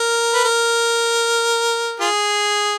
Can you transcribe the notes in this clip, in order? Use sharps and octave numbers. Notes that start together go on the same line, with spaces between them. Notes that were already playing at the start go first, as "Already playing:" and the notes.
Already playing: A#4
B4
A#4
F4 G#4